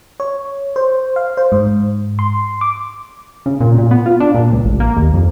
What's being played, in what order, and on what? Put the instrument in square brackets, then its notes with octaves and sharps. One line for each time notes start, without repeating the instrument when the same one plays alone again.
[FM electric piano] C#5
C5
F5
C5
G#2
C6
D6
[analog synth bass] C#3
A#2
A#2
B3
F4
D4
A#2
C#2
A1
A#3
D#2
F2